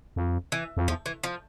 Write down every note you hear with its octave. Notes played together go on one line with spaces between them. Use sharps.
F2
E3
F2
E2 F3
E3
F3